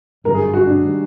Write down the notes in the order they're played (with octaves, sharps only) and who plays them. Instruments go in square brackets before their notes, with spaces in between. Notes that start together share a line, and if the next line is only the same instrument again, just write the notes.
[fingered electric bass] G#1 G2 D3 F#3 [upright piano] A#4
[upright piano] G#4
F#4
D4
[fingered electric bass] D#3 G3